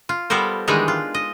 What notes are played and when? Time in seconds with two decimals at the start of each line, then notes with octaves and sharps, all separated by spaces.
0.09 F4
0.30 G3 B3 A4 A#4 C5
0.68 D#3 E3 G3 G#3 D4 D#4
0.88 F4
1.14 D#5